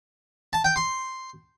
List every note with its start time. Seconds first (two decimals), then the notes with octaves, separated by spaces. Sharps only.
0.53 A5
0.64 G5
0.76 C6